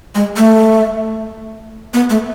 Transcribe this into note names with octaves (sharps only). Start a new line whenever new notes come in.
G#3
A3
B3
A3